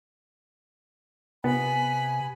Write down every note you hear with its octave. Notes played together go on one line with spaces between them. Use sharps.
C3 B3 G#5 B5